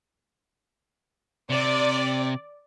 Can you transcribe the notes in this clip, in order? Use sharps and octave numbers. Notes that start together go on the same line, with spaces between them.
C3 D5